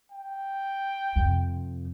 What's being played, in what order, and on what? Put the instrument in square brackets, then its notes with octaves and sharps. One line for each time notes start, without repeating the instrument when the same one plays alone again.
[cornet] G5
[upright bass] F2 C3